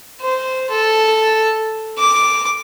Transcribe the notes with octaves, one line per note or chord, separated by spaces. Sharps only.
C5
A4
D6